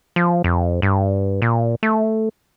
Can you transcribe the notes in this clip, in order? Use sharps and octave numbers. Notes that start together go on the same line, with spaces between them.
F3
F2
G2
A#2
A3